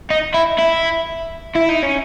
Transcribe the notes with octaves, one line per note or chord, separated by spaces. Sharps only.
D#4
E4
E4
E4
D#4
C#4